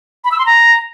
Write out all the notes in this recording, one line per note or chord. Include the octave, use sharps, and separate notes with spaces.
B5
E6
C6
A#5